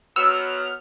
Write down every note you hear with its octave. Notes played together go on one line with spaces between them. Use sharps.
B2 F#3 B3 E6 F6